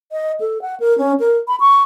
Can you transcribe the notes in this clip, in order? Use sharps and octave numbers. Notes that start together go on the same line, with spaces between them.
D#5
A4
F#5
A#4
C#4
A#4
B5
C#6